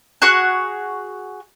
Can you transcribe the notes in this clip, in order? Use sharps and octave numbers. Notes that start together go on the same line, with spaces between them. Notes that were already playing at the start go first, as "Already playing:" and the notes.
F#4 G#4 C#6 F#6